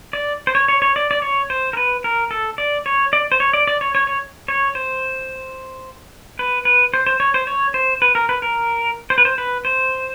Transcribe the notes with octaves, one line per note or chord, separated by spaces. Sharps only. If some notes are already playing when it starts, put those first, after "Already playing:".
D5
C5
C#5
C#5
C#5
D5
D5
C#5
C5
A#4
B4
A#4
A4
D5
C#5
D5
C5
C#5
D5
D5
C#5
C#5
C#5
C#5
C5
B4
B4
C5
C5
C#5
C5
C#5
C5
B4
A#4
B4
A#4
C5
B4
C5
B4
C5